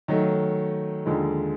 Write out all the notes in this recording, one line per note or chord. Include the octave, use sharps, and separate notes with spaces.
D#3 F#3 A3
D#2 D3 F3 G#3